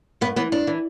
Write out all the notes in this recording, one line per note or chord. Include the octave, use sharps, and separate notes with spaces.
G2 B3
E3 B3
G2 D4
E3